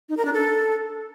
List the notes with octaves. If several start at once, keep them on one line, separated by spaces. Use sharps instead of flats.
D#4
A#4
D4
A4